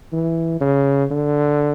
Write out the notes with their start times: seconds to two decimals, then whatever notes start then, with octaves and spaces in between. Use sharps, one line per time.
0.13 E3
0.61 C#3
1.11 D3